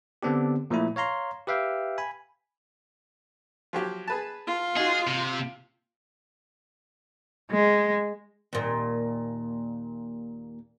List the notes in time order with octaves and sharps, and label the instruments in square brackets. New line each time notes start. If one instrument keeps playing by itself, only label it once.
[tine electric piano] D3 B3 C4 D4 G4
A#2 F3 A3 E4
C#5 F5 A#5 C6
G4 B4 E5 F5 G5
G#5 B5
[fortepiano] F3 F#3 G4
G#4 B4 A5
[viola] F4
[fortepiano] D#4 F#4 [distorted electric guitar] G#4
[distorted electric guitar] C3
[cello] G#3
[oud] D#2 A#2